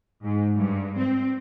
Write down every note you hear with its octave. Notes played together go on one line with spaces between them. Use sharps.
G#2
G2
C4